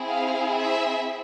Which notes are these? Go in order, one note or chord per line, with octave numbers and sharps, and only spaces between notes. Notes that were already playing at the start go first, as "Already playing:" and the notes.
Already playing: C4 E4 G#4
F5
E5